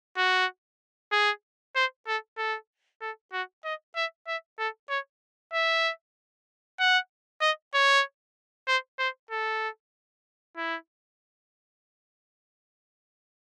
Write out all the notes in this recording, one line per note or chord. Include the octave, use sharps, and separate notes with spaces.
F#4
G#4
C5
A4
A4
A4
F#4
D#5
E5
E5
A4
C#5
E5
F#5
D#5
C#5
C5
C5
A4
E4